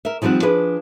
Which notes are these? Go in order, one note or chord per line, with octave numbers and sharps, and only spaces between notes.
A#4 E5
D#3 F3 G3 C4 F#5
F3 D4 G#4 B4